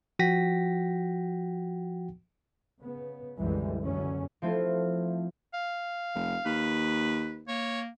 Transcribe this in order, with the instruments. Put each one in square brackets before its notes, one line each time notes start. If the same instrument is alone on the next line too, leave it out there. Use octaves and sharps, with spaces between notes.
[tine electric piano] F3 F#4 F#5 G5 A#6 B6
[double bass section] C#3 B3
C2 F#2 D3 E3 G3 G#3
F#1 F#2 D3 F#3 C#4
[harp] F3 A3 C4 E4 F4
[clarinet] F5
[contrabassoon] F1
[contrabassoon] D#2 [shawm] B4
[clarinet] A#3 [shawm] C#5